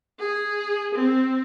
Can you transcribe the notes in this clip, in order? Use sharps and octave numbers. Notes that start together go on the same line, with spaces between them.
G#4
C4